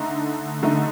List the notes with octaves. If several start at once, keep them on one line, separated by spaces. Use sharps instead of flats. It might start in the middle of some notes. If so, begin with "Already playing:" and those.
Already playing: D3 A3 D#4 A#5
D3 A3 D#4